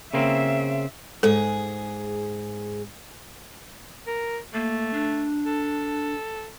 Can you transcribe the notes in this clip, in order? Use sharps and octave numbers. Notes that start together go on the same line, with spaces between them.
C#3 A#3 C4 E5
G#2 G#4 A4
A#4
A3 A#3
D4
A4